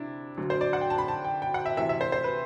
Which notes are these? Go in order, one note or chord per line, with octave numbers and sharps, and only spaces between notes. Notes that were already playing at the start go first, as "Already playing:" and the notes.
Already playing: C3 D4 E4
D2 D3 F#3
C5
D5
F#5
G5
A5
B5
A5
G5
G5
F#5
E5
D2 C3 E3 E5
E5
C5
C5
B4